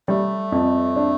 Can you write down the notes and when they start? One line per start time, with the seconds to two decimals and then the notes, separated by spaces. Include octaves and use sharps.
0.08 G3 A3
0.52 F2
0.96 D4